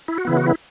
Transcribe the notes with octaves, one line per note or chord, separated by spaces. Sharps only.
E4
F#4
C#3 E3 B3 E4
F#4
E4